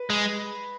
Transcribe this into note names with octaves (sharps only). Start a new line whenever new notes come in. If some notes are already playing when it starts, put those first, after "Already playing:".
Already playing: B4
G#3